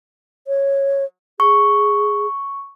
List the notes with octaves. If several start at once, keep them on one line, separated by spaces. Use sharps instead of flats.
C#5
G#4 C#6